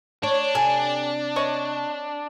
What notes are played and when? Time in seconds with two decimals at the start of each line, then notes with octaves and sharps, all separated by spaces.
0.23 D4 C#5
0.55 C3 G4 A4 G#5
1.36 C#5 D#5 C#6